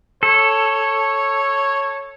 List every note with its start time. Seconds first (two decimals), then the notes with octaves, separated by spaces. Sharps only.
0.23 A4 C#5